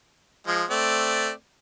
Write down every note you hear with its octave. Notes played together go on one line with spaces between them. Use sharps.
F3 G#3
A3 C4 D5